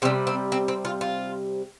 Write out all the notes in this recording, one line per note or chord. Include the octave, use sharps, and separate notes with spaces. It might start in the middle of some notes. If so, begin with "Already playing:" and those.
C3 G3 C4
C4
C4
C4
F4
F4